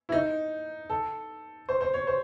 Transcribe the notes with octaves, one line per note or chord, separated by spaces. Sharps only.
E4
D#4
A4
C5
C5
C#5
C5